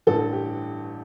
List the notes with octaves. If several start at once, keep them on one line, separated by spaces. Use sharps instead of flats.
A1 G2 D3 A4
G4